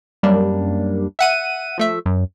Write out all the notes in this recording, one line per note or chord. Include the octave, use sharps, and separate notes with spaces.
F#2 G3 A#3 D4
E5 F#5 D#7
F3 A3 E5
F#2